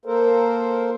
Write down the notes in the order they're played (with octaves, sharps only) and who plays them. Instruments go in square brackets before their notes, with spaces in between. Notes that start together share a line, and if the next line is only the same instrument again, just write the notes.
[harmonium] A#3 A4 A#4 C5